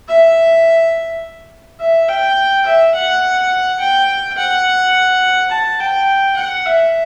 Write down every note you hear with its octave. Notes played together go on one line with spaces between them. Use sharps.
E5
E5
G5
E5
F#5
G5
F#5
A5
G5
F#5
E5